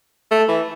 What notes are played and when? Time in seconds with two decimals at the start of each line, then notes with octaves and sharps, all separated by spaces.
0.31 A3
0.48 E3